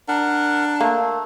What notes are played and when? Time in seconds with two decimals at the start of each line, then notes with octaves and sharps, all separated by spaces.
0.08 D4 A#4 F#5
0.81 A3 A#3